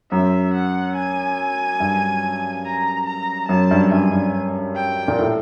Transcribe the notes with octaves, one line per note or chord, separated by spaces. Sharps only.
F#2 E5
F#5
G#5
G2
A#5
A#5
F#2 A5
G2
G2 G#5
G2
G5
A#2
A2